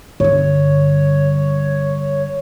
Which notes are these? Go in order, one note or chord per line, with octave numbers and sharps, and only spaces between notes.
G2 D3 C#5